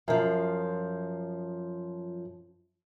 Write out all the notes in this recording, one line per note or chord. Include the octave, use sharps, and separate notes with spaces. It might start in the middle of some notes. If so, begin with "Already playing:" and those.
F#2 F3